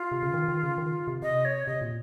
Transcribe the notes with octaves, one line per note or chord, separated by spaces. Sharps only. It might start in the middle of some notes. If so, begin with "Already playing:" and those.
Already playing: F4
C3
C#3
D#3
D#3
C#3
D#3
C3
C3 D#5
C#5
C3 D#5
A#2